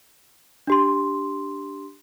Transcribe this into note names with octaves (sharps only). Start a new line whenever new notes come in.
D4 G4 C6